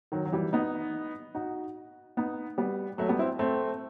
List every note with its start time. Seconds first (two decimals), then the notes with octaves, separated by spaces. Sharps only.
0.12 D#3 F#3
0.25 F#3
0.32 E3 G3
0.53 B3 D#4
1.35 D#4 F#4
2.17 B3 D#4
2.58 G3 B3
2.98 F#3 A3
3.09 G3 B3
3.19 C4 E4
3.39 A3 C4